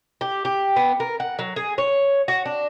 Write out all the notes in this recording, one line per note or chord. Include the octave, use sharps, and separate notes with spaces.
G4
G4
B3
A#4
F#5
F#3
G#4
C#5
F#4
D4